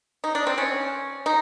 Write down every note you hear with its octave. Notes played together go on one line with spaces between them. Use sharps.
D#4
D4
C4
C#4
D#4